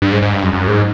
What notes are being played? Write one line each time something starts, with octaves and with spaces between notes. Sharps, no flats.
G2
G#2
G#2
G2
F#2
F#2
G#2